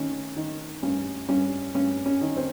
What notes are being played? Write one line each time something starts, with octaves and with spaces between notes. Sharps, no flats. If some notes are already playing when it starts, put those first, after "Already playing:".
Already playing: D#3 C#4
D#3
G2 C#4
G2 C#4
G2 C#4
C#4
D#3
C4